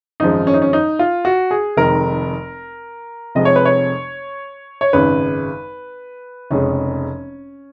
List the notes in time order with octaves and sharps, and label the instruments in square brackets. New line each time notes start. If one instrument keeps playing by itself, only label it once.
[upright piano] G#1 F#2 F3 G#3 D#4
C#4
D#4
C#4
D#4
F4
F#4
G#4
F1 F2 D#3 G#3 A#4
F1 F2 F3 G#3 D#5
C#5
B4
C#5
C#5
G#1 F#2 C#3 G#3 B4
F1 F2 C#3 G#3 C#4